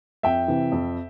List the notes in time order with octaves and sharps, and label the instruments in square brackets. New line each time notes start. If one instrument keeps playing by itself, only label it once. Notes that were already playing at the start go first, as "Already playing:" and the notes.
[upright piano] F2 E5 G5
C3 E3
F2